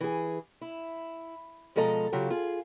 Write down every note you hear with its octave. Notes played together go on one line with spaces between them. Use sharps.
E3 G#4
E4
B2 F3 G#3 A4 D#5 A#5
C#3 F#3 F4 G4
F4 G#4